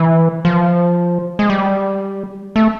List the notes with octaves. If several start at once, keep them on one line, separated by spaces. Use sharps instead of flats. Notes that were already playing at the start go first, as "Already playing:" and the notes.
Already playing: E3
F3
G#3
G3
A3